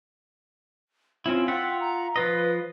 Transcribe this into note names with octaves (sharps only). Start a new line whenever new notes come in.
C4 C#4 E4 F4
F4 E5 F#5 G5
A#5
F3 F4 B4 D#5